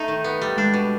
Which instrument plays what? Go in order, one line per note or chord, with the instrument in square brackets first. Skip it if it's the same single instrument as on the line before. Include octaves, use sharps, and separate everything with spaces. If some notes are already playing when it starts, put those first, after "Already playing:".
Already playing: [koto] A3 D#4
D#3
B3
G3
[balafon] G#3 [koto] D4
[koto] B2